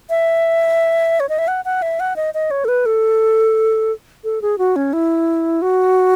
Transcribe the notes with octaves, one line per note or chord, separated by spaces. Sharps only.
E5
C#5
D#5
E5
F#5
F#5
E5
F#5
D#5
D#5
C#5
A4
B4
A4
A4
G#4
F#4
C#4
E4
F#4